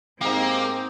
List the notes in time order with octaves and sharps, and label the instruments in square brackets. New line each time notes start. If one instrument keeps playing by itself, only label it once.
[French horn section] G#2 [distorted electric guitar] A#3 [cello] C4 [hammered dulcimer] D#4 G4